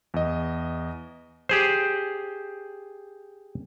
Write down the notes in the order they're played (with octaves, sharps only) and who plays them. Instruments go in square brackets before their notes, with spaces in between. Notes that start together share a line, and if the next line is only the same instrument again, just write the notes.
[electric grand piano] E2 D#5
[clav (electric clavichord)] G4 G#4 C5